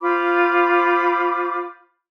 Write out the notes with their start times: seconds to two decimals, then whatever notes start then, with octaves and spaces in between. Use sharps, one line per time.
0.01 F4 C5 B5 D6